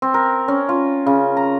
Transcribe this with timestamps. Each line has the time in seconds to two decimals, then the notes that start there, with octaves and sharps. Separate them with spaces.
0.02 C4
0.14 A#4
0.48 C#4
0.69 F4
1.06 C#3
1.37 A#5